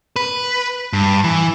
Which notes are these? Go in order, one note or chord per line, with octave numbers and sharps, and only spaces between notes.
B4
G2
E3